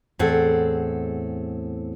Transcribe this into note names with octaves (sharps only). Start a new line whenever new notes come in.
E2 A2 C4 G#4 A4 F#5